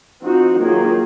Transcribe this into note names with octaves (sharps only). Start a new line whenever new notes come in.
F3 C4 D#4 F#4
D#3 F#3 A#3 F4 G#4